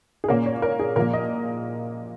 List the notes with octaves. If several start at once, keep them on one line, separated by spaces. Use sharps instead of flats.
G#4
A#2 A#3 C#4 A#4
C#5
A#4
G#4
A#2 F3 A#3 A#4
D#5